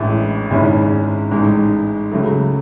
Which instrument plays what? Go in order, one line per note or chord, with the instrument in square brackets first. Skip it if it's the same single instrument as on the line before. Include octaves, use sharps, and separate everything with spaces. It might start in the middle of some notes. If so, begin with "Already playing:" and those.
Already playing: [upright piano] A1 A2 E3 G#3 D4
G#1 G#2 G#3 C#4 E4
A1 G#2 G#3
C#2 C#3 F#3 A3